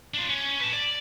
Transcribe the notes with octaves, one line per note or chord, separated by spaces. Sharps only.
D4 F4
C#4
B4 A5
D5